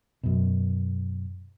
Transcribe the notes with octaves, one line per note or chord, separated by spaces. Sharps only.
F#2 B2